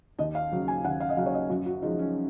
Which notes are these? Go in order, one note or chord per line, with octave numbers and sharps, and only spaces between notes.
D#2 D#5
F5
C#3 F#3
G#5
D#2 F#5
F5
D#5
C#3 F#3 F5
C#5
D#5
F#2 F#4
F#4
F3 G#3 D#4
C#4